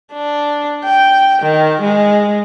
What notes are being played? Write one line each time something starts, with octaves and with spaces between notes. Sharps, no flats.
D4
G5
D#3
G#3